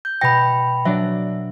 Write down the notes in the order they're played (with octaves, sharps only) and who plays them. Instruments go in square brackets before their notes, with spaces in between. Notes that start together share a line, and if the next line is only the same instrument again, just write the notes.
[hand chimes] G6
[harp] B2 A#6 [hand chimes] G5 B5
[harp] F#3 D4 D5 [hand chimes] E5